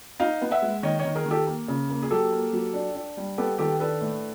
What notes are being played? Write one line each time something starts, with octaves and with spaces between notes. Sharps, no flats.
D#4 D#5 F5
B3
E5 F#5
G#3
D#3 C#5 D#5
C#5 D#5
D#3
G#4 A#4
D#3
G4 A4
A#3
C#3
A#3
G#4
F#3 G4 A4
A#3
F#3
D4
D4
G3
B3 G4 A4
D#3 G4 A4
D4 A4 B4
A2